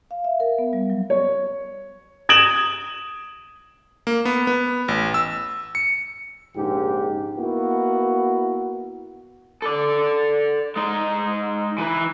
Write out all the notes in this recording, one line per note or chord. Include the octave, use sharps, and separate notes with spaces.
F5
E5
A#4
B3
G3
F#3
C#5
D#6 G#6 D7 E7 F#7
A#3
B3
B3
A1
E6
C#7
A#1 G#2 C#3 G4
A#3 B3 E4 F#4
A4 D5
G#3 D#4
E3 B4